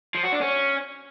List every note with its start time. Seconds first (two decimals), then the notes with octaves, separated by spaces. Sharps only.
0.15 F3
0.23 F#4
0.32 D4
0.41 C#4